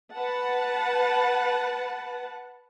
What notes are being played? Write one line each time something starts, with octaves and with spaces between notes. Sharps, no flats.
B4 F#5 A5